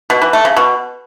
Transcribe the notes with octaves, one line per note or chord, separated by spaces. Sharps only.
B2
E3
A3
C#3
B2